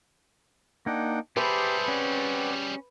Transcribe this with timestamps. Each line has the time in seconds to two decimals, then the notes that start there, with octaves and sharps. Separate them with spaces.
0.86 A#3 D4 D#4 F#5 G5
1.37 G3 G4 G#4 B4 C5 E5 A5
1.88 C4 C#4 D5 F#5